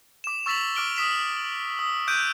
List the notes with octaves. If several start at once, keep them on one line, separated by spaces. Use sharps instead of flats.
D6 E7
C#6 E6 A6 B6 F7 F#7
D6 F6 D7 G7
D#6 B6 E7
D#6
D6 E6 F#6 G6 D7 D#7